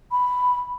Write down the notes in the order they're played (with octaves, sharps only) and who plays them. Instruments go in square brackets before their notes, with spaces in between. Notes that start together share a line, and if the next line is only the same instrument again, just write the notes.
[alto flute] B5